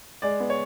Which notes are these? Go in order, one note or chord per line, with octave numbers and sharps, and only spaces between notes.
G#3 D5
B3
C#5